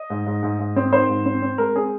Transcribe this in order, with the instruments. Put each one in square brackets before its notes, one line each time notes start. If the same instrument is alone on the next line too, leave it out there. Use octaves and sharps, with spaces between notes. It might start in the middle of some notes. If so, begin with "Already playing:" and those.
Already playing: [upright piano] D#5
G#2
G#2
G#2
G#2
C4
D#3 C5
G#2
C4
C4
G#3 A#4
C4 G#4